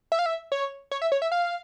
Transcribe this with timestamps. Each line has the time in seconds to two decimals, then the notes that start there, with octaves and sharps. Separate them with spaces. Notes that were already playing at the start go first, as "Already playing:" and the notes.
0.12 E5
0.19 F5
0.26 E5
0.52 C#5
0.91 C#5
1.02 E5
1.12 C#5
1.22 E5
1.32 F5